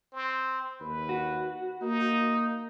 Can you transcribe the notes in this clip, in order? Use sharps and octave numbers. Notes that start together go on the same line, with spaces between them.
C4
D#2 B4
F#4
A#3 D#4